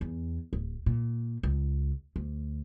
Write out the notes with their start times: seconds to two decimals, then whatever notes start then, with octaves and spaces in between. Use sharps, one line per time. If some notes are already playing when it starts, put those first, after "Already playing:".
0.01 E2
0.53 D1
0.86 A#2
1.43 C#2
2.16 D2